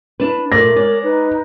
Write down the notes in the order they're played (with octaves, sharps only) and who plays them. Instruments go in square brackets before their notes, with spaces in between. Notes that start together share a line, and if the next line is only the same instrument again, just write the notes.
[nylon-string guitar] D4 E4 B4
[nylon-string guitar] A#2 D5 [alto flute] A3 [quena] A#4 [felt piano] A#6
[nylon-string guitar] G#3 D5 [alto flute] C#5
[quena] D#4 [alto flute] B4